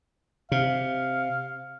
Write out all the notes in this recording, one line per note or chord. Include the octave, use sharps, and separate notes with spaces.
C3 F5